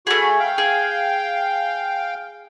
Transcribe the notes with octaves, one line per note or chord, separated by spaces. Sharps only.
A3 F#4 G#4 B5
F5 G5
G#4